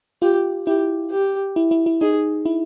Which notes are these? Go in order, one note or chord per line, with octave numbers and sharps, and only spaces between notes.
F4 G4
E4 G4
G4
E4
E4
E4
D#4 G#4
E4